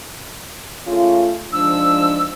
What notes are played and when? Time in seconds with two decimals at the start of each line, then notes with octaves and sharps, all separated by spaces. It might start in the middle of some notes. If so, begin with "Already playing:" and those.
0.87 C#3 A3 F4
1.53 G#2 F3 D4 E6